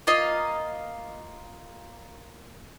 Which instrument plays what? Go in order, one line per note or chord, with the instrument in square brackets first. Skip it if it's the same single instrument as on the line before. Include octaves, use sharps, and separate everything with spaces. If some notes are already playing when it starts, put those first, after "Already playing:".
[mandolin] A#3 F4 D#5 F5